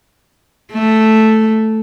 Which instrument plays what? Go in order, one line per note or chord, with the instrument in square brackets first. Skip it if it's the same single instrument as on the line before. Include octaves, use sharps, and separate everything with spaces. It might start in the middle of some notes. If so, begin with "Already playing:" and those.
[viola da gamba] A3